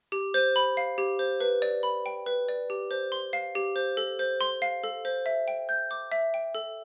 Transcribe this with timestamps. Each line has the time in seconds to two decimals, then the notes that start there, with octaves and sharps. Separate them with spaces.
0.12 G4
0.34 C5
0.56 B5
0.77 F5
0.98 G4
1.19 C5
1.40 B4
1.62 D5
1.83 B5
2.06 G5
2.26 B4
2.49 D5
2.70 G4
2.91 C5
3.12 C6
3.33 F5
3.55 G4
3.76 C5
3.97 A4
4.19 C5
4.41 C6
4.62 F5
4.84 A4
5.05 C5
5.26 E5
5.48 G5
5.69 G6
5.91 D6
6.12 E5
6.34 G5
6.55 A4